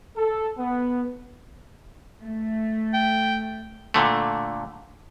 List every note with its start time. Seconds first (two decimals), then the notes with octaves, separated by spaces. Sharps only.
0.17 A4
0.58 B3
2.22 A3
2.94 G5
3.94 A#2 D3 A3